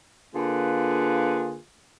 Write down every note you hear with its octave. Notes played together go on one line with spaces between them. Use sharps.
D3 A#3 F4 G#4 B4